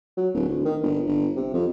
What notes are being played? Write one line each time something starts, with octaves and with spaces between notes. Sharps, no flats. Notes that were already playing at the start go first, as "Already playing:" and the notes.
F#3
D1
D2
D#3
G1
G1
C3
F2